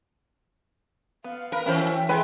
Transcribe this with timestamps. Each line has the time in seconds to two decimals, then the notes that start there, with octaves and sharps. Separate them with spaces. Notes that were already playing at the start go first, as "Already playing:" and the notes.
1.24 B3 F5
1.52 A#4 B4 B5
1.66 E3 C#4 F#4 A#4 C5 E5 G5
2.09 G#3 E4 B4 G5